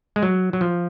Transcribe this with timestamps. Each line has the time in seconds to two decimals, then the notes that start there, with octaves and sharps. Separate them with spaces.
0.16 G#3
0.23 F#3
0.53 F#3
0.61 F3